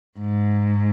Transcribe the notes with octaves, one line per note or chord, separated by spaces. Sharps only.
G#2